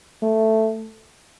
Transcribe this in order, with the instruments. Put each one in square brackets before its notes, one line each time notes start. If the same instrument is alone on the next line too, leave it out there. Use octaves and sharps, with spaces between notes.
[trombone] A3